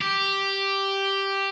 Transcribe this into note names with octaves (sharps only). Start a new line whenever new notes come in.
G4